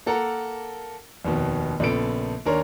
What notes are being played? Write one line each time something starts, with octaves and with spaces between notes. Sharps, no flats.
A#3 A4 A#4 F#5 A#5
F1 D#2 B2
A#1 A#2 C#3 B3 A4 D7
D#2 D4 A#4 C#5 C6